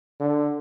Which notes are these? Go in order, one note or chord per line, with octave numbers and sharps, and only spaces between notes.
D3